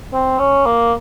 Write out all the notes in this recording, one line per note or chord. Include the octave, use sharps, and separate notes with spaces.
C4
C#4
A#3